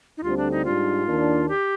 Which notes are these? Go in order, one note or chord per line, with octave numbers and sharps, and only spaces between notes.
D#4
D2 D3 G3 C4 F4 G4
D4
D#4
G#2 G3 D4 F4
D#2 D#3 A#3 D4
G4